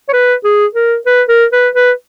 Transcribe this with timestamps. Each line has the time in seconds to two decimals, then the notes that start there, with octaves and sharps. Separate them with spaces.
0.09 C#5
0.13 B4
0.44 G#4
0.75 A#4
1.06 B4
1.29 A#4
1.52 B4
1.75 B4